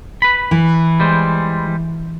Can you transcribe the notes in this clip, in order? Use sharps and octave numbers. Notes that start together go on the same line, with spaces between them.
B4 B5
E3
G3 G#3 C5